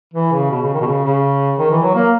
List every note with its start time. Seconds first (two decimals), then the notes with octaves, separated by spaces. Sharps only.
0.14 E3
0.33 C#3
0.51 B2
0.62 C#3
0.74 D#3
0.81 B2
0.87 C#3
1.04 C#3
1.59 D#3
1.71 E3
1.83 F#3
1.95 A#3